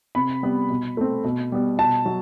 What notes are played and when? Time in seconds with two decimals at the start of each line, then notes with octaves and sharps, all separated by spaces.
0.15 C3 B5
0.43 G3 B3
0.70 B2
0.97 A3 C4
1.24 B2
1.52 G3 B3
1.78 B2 A5
2.06 F#3